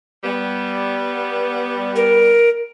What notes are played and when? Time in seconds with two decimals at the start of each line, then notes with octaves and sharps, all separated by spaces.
0.24 G3 B3
1.96 A#4